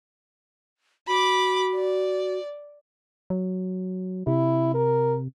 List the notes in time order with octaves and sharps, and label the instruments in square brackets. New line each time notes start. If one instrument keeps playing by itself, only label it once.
[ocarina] F#4 [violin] B5 D6
[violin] D5
[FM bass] F#3
[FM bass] C3 [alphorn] E4
[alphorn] A#4